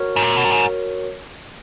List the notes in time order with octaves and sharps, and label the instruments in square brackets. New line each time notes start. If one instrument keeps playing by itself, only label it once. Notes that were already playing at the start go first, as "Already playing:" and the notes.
Already playing: [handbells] F#4 A#4 C#5
[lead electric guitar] G#2
A#2
B2
F#2
G#2